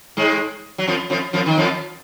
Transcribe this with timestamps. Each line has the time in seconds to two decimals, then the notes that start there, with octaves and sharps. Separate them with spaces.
0.17 G#2 G#3
0.78 F#3
0.87 F2 F3
1.10 F2 F3
1.33 F2 F3
1.46 D#3
1.58 F2 F3